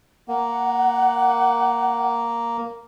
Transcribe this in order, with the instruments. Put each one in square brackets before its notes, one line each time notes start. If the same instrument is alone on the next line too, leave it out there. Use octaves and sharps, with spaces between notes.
[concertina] A#3 [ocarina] F#5